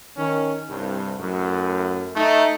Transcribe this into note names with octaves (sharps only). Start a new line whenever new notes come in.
D#3 C#4
C2 G2
F#2 A2
A3 D#4